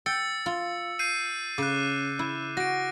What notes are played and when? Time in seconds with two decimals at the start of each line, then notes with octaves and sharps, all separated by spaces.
0.06 G5 E6 A6 C#7
0.46 F4
0.99 G6 C7 D#7
1.58 C#3 D6 F#6
2.19 E4
2.57 F#4 A#6 D7